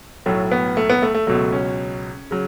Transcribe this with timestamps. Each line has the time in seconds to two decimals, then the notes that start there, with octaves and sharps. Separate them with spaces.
0.26 B1 A2 F#3 A3
0.51 B3
0.77 A3
0.90 B3
1.02 A3
1.15 A3
1.27 C#2 B2 F#3 A3
1.52 C#4
2.31 C#3 F#3